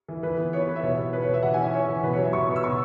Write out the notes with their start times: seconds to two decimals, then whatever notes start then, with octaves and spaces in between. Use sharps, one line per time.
0.08 E3
0.23 E3 B4
0.38 B3
0.53 B3 C#5
0.68 E3 B4
0.76 E5
0.83 B2 C#5
0.98 B3
1.13 B3 B4
1.23 C#5
1.28 B2
1.34 E5
1.43 E3 F#5
1.54 G#5
1.58 C#4 E5
1.73 C#4 C#5
1.88 E3
2.03 B2 B4
2.13 C#5
2.18 F#3
2.24 E5
2.33 B2 C#6
2.48 B3
2.56 E6
2.64 B2 C#6